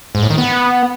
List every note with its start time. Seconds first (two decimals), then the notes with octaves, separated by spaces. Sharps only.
0.15 G#2
0.22 A2
0.30 D#3
0.38 B3